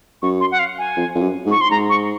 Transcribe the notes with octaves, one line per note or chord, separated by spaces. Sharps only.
F#2 C#6
C6
F#5
F5
G#5
F2
F2
F#2
G#2
C#6
C6
G#2 A#5
C#6